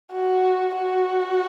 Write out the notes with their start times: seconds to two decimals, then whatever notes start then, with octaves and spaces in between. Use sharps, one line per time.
0.13 F#4
0.76 F#4